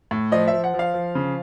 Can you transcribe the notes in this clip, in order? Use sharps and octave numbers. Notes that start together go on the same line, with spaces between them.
A2
F3 D#5
E5
F3
F#5
F3
F5
F3
C#3